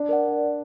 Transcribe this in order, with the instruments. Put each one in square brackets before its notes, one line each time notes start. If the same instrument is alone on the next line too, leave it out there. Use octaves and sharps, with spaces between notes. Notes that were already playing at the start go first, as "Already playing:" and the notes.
Already playing: [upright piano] D4
[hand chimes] A#4 D5 F#5